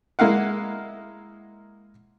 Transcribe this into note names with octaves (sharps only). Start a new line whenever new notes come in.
G#3 A#3 E4 F5 F#5